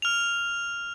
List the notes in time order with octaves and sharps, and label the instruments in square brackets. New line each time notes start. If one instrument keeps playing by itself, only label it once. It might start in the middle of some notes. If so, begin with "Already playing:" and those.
[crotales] F6 F7